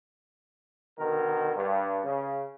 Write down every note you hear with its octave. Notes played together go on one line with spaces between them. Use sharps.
B2 D3 D#3 A#4
G2
C#3